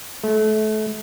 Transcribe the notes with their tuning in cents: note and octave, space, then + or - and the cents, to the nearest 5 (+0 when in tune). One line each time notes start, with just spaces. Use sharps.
A3 -30